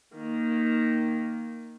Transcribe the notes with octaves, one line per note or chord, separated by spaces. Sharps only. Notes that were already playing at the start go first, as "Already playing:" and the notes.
D#3 A#3